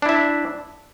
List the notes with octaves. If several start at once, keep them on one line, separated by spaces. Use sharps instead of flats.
D4 E4 E5